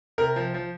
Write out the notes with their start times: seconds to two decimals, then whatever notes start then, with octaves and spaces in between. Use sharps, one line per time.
0.18 C3 A#4
0.36 F3
0.54 F3